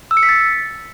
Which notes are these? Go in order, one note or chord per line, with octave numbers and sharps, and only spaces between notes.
E6
C#7
B6
A6